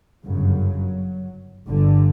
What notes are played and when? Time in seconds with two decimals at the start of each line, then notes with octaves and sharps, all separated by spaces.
0.24 G1 F#2 C#3 F#3
1.68 G1 G2 D3